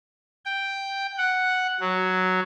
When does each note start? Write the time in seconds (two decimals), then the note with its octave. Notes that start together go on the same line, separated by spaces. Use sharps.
0.45 G5
1.18 F#5
1.80 F#3